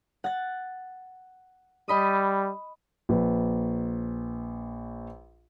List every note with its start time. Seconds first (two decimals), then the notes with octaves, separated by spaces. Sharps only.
0.24 F#5 F#6 A6
1.88 G3 D#5 B5 D#6
3.09 A#1 B4